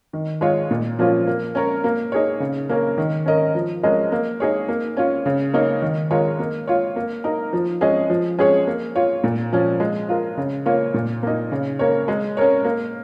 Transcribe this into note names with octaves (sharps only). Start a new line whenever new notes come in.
D#3
G#3 F4 C#5
A#2
F3 A#3 C#4 F4
A#3
C#4 A#4 C#5
A#3
D#4 G#4 C#5
C#3
A#3 C#4 A#4
D#3
C#4 A#4 D#5
F3
G#3 C#4 A#4 D#5
A#3
D#4 G#4 C#5
A#3
C#4 F4 C#5
C#3
A#3 D#4 C#5
D#3
G#3 F4 A#4 C#5
A#3
F4 C#5
A#3
D#4 A#4
F3
G#3 C#4 G#4 D#5
F3
G#3 C#4 G#4 C#5
A#3
F4 C#5
A#2
F3 C#4
G#3
F4 A#4
C#3
A#3 F4 C#5
A#2
A#3 D#4
C#3
A#3 C#4 A#4 C#5
G#3
C#4 A#4 C#5
A#3